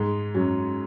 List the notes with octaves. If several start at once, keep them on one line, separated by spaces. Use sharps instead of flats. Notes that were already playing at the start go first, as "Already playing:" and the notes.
Already playing: G#2 G#3
F#2 F#3